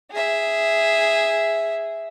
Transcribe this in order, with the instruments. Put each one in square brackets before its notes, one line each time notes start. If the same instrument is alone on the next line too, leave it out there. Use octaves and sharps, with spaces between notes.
[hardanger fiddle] G#4 E5